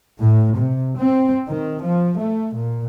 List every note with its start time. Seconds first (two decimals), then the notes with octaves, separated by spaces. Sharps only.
0.20 A2
0.56 C3
0.98 C4
1.49 D#3
1.82 F3
2.19 A3
2.56 A#2